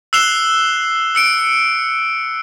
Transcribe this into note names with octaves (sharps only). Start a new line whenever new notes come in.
E6 F#6 C7 E7 F7 G7
E6 C#7 D7